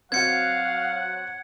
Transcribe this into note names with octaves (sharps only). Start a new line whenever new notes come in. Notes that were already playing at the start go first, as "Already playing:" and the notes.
F#3 C4 F#4 F5 F#5 G#6 C#7